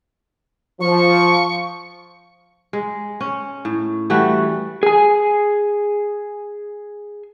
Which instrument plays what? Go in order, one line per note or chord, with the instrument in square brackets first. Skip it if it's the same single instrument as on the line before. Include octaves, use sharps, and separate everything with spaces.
[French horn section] F3 [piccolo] C#6
[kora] G#3
C#4
A2
E3 G3 A3 F#4
[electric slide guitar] G#4 G#5